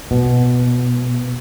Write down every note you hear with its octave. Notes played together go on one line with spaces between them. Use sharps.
B2